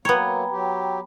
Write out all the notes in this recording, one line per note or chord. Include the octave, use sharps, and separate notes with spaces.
F#3 A#3 B3 C#5 G5 A#5 B5
F#3 G4